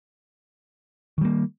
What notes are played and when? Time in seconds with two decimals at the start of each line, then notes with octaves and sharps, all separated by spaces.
1.18 D#3
1.21 G3
1.25 A#3